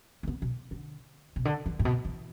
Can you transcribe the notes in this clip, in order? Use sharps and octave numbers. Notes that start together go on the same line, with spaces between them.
A3
B3
B2
D3
B2
D3
E3
A2
B2
E3